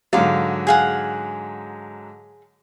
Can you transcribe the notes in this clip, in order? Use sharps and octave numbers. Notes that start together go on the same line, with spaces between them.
G#2 D3 F#3 F5 D6
G#4 F5 F#5